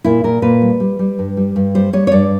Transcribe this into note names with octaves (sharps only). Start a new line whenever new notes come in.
A#2 E4
A#2 A#4
A#2 B4
G3
G3
G3
G2
G3
G2
G3 C5
G3 C#5
C#5
G2 D5